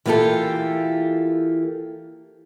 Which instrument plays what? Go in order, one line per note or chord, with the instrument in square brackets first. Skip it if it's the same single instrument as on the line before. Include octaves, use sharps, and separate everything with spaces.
[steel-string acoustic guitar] E3 A#3 F4 G4 A4